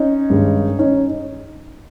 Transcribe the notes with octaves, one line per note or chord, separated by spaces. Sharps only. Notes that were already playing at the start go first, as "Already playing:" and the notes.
Already playing: C#4 D#4
G2 D#3 G#3
C#4 D#4